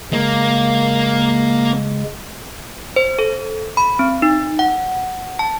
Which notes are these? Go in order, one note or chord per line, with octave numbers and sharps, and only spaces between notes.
C#3 G#3 A#3
C5
A4
B5
C4
D#4
F#5
A5